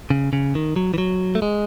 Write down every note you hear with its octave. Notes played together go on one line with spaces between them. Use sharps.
C#3
C#3
D#3
F#3
E3
F#3
A3
G#3